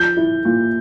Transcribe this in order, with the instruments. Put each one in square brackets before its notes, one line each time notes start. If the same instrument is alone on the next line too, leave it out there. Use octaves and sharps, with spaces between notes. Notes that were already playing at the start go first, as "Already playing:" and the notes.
Already playing: [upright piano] F3 [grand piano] G6
[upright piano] E4
A#2